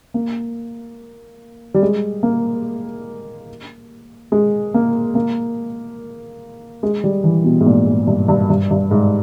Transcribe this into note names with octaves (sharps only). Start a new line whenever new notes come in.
A#3
G3
G#3
A#3
G#3
A#3
A#3
G#3
G3
E3
B2
G#2
A#2
G#2
G2
G2
G2
G2
G#2